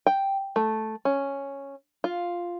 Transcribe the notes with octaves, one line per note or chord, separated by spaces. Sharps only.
G5
A3
C#4
F4